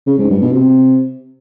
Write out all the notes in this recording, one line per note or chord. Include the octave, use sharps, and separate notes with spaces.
C#3
G#2
G2
B2
C3